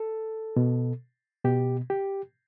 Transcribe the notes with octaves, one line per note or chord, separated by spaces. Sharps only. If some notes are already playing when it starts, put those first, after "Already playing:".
Already playing: A4
B2
B2 G4
G4